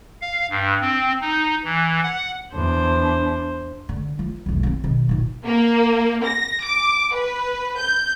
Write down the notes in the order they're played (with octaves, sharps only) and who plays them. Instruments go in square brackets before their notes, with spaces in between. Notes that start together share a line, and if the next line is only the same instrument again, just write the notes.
[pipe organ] F5
G2
C4
D#4
E3
F#5
[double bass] E2 D4 [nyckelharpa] C5
[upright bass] D3
F3
B1 E2
A#3 C4
B2 D#3
A#2 D#3
[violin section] A#3
A#6
D6
B4
G6